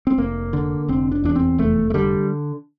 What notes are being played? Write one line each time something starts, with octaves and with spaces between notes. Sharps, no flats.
C4
F1 A#3
D3
F1 C4
D4
E2 D4
C4
F1 A3
A3
D3 G3